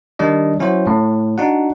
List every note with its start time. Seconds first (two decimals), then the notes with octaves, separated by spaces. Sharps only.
0.19 D#3 G3 D4 D#5
0.59 F#3 C#4 E4 F#4 C5
0.87 A2
1.38 D4 D#4 F#4 F#5